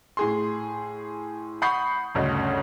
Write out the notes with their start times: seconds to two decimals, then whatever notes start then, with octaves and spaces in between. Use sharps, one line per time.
0.17 A2 G#4 C6
1.62 F#5 B5 C#6 D#6 G6 C7
2.15 G1 D2 C#3 D#5